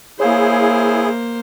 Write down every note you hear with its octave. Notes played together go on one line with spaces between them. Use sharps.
A#3 E4 G#4 C5 C#5 F5